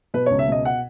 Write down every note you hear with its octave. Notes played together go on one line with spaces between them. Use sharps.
B2 B4
C#2 C#5
E5
B2 D#5
F#5